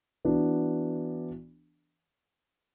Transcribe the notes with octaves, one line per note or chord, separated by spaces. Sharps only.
E3 B3 D4 F#4